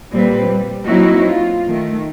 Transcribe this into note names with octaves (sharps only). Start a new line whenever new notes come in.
A#2 G3 C4 B4
G3
F#3 A#3 C4 D#4 E4 F#4
F4
D#3 A3